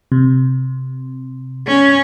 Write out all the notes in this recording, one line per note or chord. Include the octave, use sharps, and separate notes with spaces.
C3
C#4